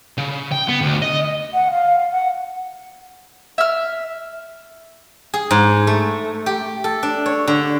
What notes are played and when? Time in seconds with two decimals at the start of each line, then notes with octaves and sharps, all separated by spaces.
0.18 C#3
0.52 G5
0.68 B3
0.81 D2
1.02 D#5
1.54 F#5
1.71 F5
2.12 F#5
3.58 E5 F6
5.34 G#4
5.51 G#2
5.87 A3
6.46 G4
6.84 A4
7.03 D4
7.26 C#5
7.47 D3